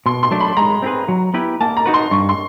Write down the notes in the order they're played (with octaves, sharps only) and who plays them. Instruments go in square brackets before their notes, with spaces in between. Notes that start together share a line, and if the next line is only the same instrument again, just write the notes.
[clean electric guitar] B2 [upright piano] C6
[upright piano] C6
[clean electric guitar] F#3 A3 D4
[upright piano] B5
[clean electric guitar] G#3 [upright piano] A#5
[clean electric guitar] C4 E4 G#4 B4
F#3
B3 E4 G4 B4
[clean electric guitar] A#3 [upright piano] A5
[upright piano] A#5
[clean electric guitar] D#4 F#4 B4
[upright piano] C6
[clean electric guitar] G2 [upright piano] C#6
[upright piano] C6